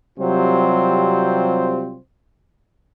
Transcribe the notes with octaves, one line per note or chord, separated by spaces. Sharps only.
C3 F#3 G3 C4 F4 C5